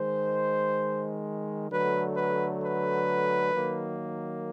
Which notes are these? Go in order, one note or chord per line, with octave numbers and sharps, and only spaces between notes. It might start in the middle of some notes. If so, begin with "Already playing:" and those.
Already playing: D#3 G#3 C5
D3 F#3 A3 B4
B4
B4
D#3 F#3 A#3